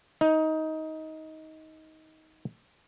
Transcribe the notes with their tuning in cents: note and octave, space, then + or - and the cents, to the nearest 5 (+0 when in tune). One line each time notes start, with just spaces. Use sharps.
D#4 +20